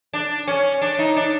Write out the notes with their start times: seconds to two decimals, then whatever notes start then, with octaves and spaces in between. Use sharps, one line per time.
0.13 D4
0.47 C#4
0.82 D4
0.99 D#4
1.17 D4